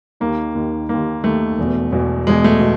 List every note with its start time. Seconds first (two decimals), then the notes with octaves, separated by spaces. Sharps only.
0.20 D#2 D#3 A#3
0.55 D#2 D#3
0.89 D#2 D#3 A#3
1.24 D#2 D#3 A3
1.58 E1 E2 B2
1.92 E1 E2 B2
2.27 E1 E2 B2 G#3
2.44 A3
2.60 B2